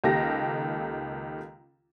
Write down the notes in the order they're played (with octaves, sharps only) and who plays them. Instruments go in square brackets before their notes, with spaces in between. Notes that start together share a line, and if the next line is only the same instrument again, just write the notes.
[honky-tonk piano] C#2 D#3 A#3 G4 A4 A#6